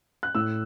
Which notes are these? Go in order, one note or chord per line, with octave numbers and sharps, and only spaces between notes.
F#6
A2 E6